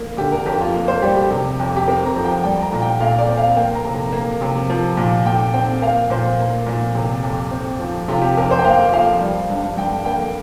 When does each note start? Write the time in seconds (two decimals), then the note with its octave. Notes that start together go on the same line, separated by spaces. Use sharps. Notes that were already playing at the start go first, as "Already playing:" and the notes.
Already playing: A#3
0.17 D3 G4
0.32 A#4
0.46 F2 G4
0.61 F4
0.74 A#3
0.88 C5
1.02 G3 G4
1.17 G4
1.30 C3
1.60 F2
1.77 G4
1.87 C4 A#4
2.05 A#5
2.16 F3
2.24 G5
2.43 G3 G5
2.62 A#5
2.72 A#2
2.82 G5
3.00 A#2 F5
3.19 D5
3.28 C4
3.37 F5
3.56 A#3 G5
3.75 A#5
3.85 C3
3.95 A#5
4.13 A#3
4.41 C3
4.70 F3
4.97 A#2
5.26 A#2 G5
5.54 C4 G5
5.82 A#3 F5
6.10 A#2 C5
6.39 A#3
6.66 A#2
6.95 C3
7.23 F2
7.51 C4
7.80 F3
8.08 C3 F4
8.22 G4
8.37 F2 A#4
8.51 C5
8.59 G5
8.64 A#3 F5
8.92 F3 F5
9.21 G3
9.50 G2
9.77 G2 G5
10.05 A#3 G5